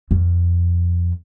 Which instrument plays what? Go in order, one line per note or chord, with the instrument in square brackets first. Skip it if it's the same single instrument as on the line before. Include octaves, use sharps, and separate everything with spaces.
[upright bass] F2